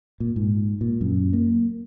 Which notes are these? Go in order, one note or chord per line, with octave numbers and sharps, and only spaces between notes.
A#2
G#2
A#2
F#2
A#3